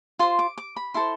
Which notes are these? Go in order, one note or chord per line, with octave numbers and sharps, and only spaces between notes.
F4 C5 C6
D6
D6
B5
E4 A4 C5 C6